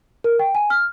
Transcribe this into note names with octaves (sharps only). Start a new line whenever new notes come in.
A#4
G5
G#5
F6